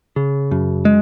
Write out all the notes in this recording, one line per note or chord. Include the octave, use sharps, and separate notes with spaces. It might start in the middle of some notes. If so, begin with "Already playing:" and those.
C#3
F#2
G#3